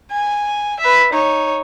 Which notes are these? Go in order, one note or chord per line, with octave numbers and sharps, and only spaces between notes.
G#5
B4 E5
D#4 C#5